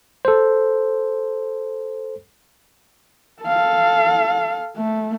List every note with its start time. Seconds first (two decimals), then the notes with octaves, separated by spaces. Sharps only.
0.25 A4 C5
3.42 A4 F5
4.77 A3